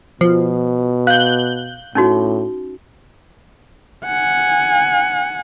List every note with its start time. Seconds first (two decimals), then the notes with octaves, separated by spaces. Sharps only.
0.21 B2 F3
1.07 F5 F#6 G6
1.95 A2 C#4 D#4 F#4
4.05 F#5 G#5